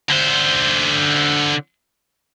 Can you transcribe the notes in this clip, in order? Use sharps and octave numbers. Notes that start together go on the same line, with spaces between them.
D3 C5